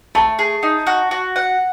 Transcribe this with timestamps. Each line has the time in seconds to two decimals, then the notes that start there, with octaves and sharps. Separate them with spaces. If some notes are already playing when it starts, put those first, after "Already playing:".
0.15 A3 A5
0.39 G#4
0.63 D#4
0.87 F#4
1.11 F#4
1.36 F#5